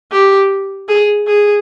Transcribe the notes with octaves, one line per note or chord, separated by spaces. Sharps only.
G4
G#4
G#4